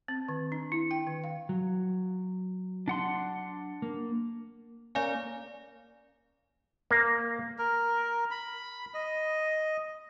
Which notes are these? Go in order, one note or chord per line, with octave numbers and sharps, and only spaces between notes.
C4
D#3
D4
E4
G5
D#3
F5
F#3
D4 F#5 C6
A#3
A#3 C#4 D5 F5 G#5
A#3
A#4
B5
D#5